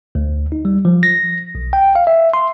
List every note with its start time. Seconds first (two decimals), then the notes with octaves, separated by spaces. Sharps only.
0.15 D2
0.52 D#4
0.65 G3
0.85 F3
1.03 A#6
1.55 B1
1.73 G5
1.95 F5
2.07 E5
2.34 C6